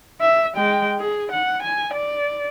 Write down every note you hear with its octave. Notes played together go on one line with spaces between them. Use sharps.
E5
G#3 G5
G#4
F#5
G#5
D5